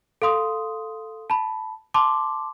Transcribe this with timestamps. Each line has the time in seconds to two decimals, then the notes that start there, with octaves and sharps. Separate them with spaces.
0.22 A4 F5 C6 D#6
1.30 A5 B5
1.94 A5 C6 D6